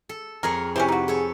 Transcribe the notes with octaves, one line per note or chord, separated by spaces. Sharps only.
A4
F2 G#4 A#4 C#5
C3 C#4 E4 G4 B4 C5
D#4 F#4
G#4 A4 C#5